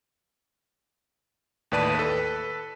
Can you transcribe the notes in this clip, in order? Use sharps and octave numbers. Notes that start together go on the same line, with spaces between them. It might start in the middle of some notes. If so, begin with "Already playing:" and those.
D#2 A2 B4 D5 A5 D#7
A4 B4